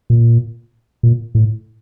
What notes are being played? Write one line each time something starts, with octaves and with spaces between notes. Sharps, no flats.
A#2
A#2
A2